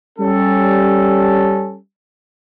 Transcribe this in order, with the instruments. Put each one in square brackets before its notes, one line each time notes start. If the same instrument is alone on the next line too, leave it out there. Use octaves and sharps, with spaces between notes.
[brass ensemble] G3 C#4 A4